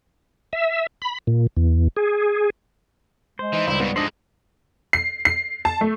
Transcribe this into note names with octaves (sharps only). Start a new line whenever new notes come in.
E5
B5
A#2
E2
G#4
G#3 C5
E3 D#4
C#2 G3 E4
G#2 F#3 B3
F2 G#2 D4 C5 D#5 F#7
C7
C7
A5
A3